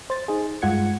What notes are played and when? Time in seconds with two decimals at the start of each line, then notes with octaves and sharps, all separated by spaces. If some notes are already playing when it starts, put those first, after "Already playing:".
0.10 C5 A6
0.28 D#4 G#4
0.62 G2 G#3 F4 F#5 G#6 C#7